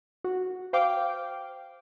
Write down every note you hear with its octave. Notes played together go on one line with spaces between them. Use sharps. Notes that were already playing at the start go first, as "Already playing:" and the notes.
F#4
C5 F5 G5 D6